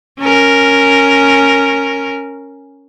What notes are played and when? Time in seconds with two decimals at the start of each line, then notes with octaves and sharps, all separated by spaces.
0.20 C#4 A#4